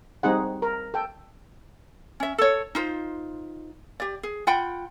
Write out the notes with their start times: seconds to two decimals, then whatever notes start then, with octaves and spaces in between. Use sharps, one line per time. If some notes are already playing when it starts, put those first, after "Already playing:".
0.23 G3 C4 D#4 G#4 F#5
0.62 A#4
0.94 A4 G5
2.20 C#4 E5
2.38 A4 C#5
2.75 D#4 F4 C5
4.00 G4 D5
4.23 G#4
4.47 F4 F#5 G5 B5